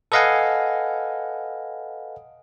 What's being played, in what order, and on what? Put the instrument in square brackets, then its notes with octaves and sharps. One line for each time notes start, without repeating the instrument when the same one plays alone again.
[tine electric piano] A4 B4 D#5 F5 F#5 G#5